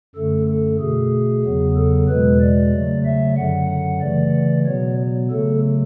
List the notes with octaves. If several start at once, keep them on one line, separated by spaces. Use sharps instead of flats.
F#2 D3 A3 A4
A4
B2 A3 G#4
E2 C#3 F#3 B3
A4
E2 B2 G#3 B4
D5
C#3 F#3 A3
E5
F#2 D3 F#3 F#5
F#5
C#3 E3 A3 D5
B2 F#3 B3 C#5
C#3 F#3 A3 A4